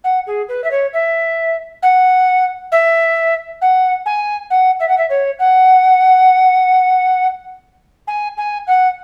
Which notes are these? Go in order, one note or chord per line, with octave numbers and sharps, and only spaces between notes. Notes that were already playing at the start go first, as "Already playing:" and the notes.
F#5
G#4
B4
E5
C#5
E5
F#5
E5
F#5
G#5
F#5
E5
F#5
E5
C#5
F#5
G#5
G#5
F#5